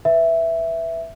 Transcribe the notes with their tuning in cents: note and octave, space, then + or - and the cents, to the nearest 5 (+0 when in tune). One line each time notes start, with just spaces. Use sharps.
B4 +0 E5 +0